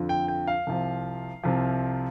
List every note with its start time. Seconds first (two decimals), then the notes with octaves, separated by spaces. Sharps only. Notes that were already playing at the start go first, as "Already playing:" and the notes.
Already playing: F2 D3 F3
0.09 G5
0.28 G5
0.47 F5
0.67 C2 C3 F3
1.43 C2 C3 F3